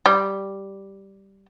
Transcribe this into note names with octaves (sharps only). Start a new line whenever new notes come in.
G3